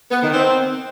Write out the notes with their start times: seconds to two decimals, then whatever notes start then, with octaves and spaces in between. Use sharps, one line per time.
0.11 B3
0.23 D#3
0.34 C4